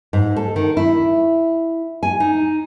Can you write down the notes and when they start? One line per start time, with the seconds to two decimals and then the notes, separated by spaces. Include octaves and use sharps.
0.13 G#2
0.36 A4
0.56 D#3
0.77 E4
2.03 G#5
2.20 D#4